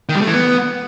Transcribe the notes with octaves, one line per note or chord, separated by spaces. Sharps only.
D#3
G3
A3
E3
B3